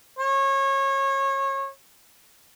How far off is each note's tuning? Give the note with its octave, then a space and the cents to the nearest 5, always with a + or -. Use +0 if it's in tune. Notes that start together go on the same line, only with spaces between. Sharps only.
C#5 -25